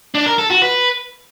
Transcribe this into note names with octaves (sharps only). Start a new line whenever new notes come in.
D4
A#4
A4
F#4
B4